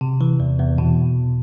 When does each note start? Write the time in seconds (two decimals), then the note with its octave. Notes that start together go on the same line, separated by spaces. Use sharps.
0.01 C3
0.21 E3
0.40 E2
0.59 E2
0.78 B2